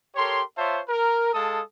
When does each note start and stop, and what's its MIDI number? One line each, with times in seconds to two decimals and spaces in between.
0.16 0.41 67
0.16 0.41 69
0.16 0.41 70
0.16 0.41 73
0.16 0.41 84
0.57 0.81 65
0.57 0.81 72
0.57 0.81 73
0.57 0.81 76
0.57 0.81 81
0.57 0.81 84
0.89 1.32 70
1.33 1.60 56
1.33 1.60 69
1.33 1.60 77
1.33 1.60 81
1.33 1.60 87